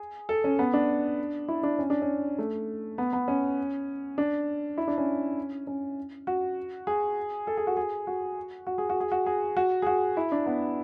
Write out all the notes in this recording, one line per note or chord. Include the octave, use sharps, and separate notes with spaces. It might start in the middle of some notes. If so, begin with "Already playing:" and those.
Already playing: G#4
A4
C#4
B3
D4
E4
D4
C#4
D4
C#4
A3
B3
B3
C#4
D4
E4
D4
C#4
C#4
F#4
G#4
A4
G#4
F#4
G#4
F#4
F#4
G#4
F#4
G#4
F#4
G#4
F#4
G#4
F#4
E4
D4
B3